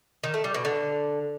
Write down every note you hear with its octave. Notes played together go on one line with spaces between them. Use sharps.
D#3
A3
G3
B2
D3